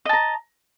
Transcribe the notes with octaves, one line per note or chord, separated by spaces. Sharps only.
D#5 A5 A#5